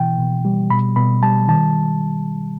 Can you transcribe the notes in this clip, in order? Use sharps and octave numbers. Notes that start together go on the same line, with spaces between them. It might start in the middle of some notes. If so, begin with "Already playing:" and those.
Already playing: B2 E3 G5
B2
G3
B2 B5
B2 B5
G3 A5
D#3 A5